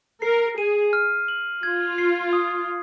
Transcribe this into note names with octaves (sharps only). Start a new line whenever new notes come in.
A#4 C7
G#4 D#7
F6
F#7
F4 G#6
C7
D#6